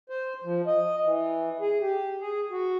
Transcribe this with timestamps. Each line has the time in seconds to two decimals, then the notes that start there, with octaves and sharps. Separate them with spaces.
0.10 C5
0.44 F3
0.67 D#5
1.04 E3
1.61 G#4
1.81 G4
2.21 G#4
2.51 F#4